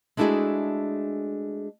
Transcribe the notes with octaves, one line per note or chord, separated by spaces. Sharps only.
G#3 A3 D4 E4 F#4 G#4